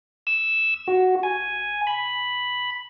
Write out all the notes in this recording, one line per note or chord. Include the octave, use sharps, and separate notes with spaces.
E6
F#4
G#5
B5